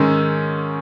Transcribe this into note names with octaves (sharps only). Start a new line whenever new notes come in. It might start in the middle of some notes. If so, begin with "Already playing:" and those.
Already playing: G#2 D#3 G#3 C#4 E6